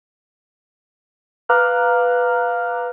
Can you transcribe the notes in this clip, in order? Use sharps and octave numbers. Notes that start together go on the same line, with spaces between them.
B4 F5 A#5 D6 F6 F#6